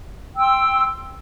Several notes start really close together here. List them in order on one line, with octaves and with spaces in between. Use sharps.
G5 E6 C6